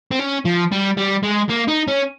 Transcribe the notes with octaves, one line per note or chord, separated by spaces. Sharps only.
C4
C#4
F3
G3
G3
G#3
A#3
D#4
C#4